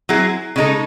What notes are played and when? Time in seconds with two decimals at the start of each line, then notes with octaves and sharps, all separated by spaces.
0.09 F#3 C4 E4 G#4
0.56 C#3 G#3 D#4 A4